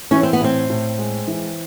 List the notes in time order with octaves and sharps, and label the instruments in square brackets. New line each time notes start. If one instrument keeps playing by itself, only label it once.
[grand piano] E3 [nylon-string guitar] C#4
[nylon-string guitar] C4
B3
[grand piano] A2 [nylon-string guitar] C4
[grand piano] A2
G#3
E3